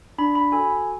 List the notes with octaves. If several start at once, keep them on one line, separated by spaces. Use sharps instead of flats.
D4 B5
B5
F#4 A4 G#5